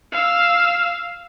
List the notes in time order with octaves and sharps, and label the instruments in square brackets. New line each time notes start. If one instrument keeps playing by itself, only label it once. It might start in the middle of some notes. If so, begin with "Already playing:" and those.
[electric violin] F5 E6